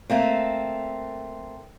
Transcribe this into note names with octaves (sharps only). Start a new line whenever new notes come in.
A3 A#3 C4